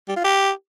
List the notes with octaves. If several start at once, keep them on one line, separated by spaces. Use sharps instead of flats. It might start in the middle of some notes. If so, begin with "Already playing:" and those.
G3
F4
G4